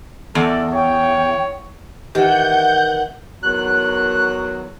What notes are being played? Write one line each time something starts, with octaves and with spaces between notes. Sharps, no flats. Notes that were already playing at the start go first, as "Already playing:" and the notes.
E2 A4 D5
C#5 G5
D#3 E3 G4 F#5 G6
E2 D#3 F#3 F#6